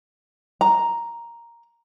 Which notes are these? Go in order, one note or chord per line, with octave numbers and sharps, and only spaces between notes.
A#5